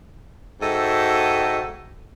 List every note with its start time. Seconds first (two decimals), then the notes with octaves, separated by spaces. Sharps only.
0.61 G#2 F#4 A4 D#5 E5 G5